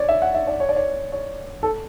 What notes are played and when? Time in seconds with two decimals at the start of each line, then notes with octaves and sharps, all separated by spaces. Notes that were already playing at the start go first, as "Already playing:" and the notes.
Already playing: C#5 D5
0.09 E5
0.22 F#5
0.34 E5
0.47 D5
0.60 C#5
0.69 D5
0.76 C#5
1.12 C#5
1.63 A4